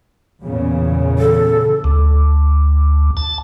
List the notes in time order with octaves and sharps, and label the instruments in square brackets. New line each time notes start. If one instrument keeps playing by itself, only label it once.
[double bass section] E2 A#2 C#3
[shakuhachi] A4
[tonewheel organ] D2
A5